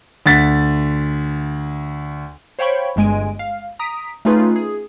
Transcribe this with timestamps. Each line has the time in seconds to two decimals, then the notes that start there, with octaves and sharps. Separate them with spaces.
0.26 D2 A6 B6
2.59 C5 C#5 F5 G5 B5 C#6
2.96 G1 G2 G#3 G#5 D7
3.39 F5
3.79 A#5 D#6 B6 D7
4.25 A3 C#4 D#4 F4 G#4 B4
4.56 G#4